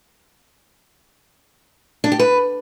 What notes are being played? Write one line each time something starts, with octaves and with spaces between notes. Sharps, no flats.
D4
G4
B4